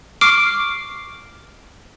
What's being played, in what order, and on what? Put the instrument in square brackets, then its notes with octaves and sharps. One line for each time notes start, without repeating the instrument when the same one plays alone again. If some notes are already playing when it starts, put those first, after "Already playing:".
[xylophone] C#6 D6 F6 C7 D7